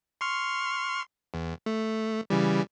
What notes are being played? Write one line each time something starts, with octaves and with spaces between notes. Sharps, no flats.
C6 C#6 F6
E2
A3
C#3 E3 G3